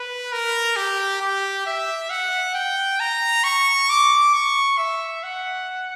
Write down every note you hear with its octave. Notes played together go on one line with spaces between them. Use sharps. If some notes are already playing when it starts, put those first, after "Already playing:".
Already playing: B4
A#4
G4
G4
E5
F#5
G5
A#5
C#6
D6
C#6
E5
F#5